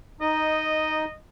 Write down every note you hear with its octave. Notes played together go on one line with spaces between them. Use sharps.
D#4 D#5